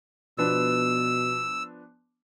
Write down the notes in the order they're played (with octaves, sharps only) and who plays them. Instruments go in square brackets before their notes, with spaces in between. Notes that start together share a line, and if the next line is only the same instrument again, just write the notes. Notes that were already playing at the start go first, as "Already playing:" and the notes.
[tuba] B2 [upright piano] F3 B3 D4 [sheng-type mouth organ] E6